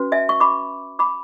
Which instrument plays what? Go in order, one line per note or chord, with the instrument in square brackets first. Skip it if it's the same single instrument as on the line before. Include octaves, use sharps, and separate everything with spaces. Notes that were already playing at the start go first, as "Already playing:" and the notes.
Already playing: [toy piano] C#4 F#4 B4
E5 G#5
C#6
B5 D6
B5 D6